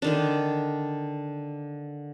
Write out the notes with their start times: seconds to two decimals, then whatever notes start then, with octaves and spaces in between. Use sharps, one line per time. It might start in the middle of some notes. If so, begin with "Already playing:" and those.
0.02 D3 D#3 D4